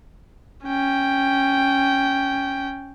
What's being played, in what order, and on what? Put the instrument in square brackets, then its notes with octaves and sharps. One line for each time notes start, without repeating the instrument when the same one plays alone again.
[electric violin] C#4 G5